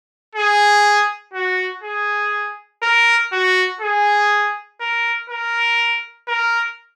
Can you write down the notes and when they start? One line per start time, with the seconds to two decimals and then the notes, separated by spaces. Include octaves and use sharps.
0.35 G#4
1.33 F#4
1.83 G#4
2.82 A#4
3.32 F#4
3.81 G#4
4.81 A#4
5.30 A#4
6.28 A#4